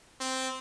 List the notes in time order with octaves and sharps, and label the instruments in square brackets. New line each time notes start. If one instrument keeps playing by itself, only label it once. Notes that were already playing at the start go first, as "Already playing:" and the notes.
[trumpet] C4